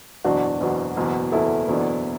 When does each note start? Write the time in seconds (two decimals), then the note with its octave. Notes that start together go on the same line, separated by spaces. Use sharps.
0.24 F#1 E2 B2 D4 F#4
0.60 F#1 E2 B2
0.96 F#1 E2 B2
1.32 F#1 E2 B2 E4 A4
1.68 F#1 E2 B2 F#3 D4